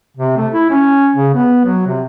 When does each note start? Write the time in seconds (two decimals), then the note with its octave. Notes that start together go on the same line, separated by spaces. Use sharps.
0.17 C3
0.37 A3
0.52 E4
0.70 C#4
1.16 C#3
1.34 B3
1.64 F#3
1.86 C3